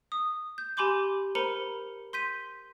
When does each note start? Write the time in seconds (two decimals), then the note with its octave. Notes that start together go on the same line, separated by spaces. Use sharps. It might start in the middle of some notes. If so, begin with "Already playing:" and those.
0.12 D#6
0.58 G6
0.77 G4 G#5 B5 C6 D6 G6
1.35 A#4 C5 A#5 B5 C#7 D#7
2.13 C6 G6 B6 D#7